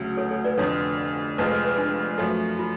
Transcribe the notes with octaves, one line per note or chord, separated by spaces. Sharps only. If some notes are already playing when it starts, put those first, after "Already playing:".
Already playing: D2 C#3 F#3
A4 C#5
A4 C#5
B4 D5
F1 F2 D3 A4 C#5
F1 F2 F3 G#3 B4
A4
B4
D4
F#2 F3 A3
F4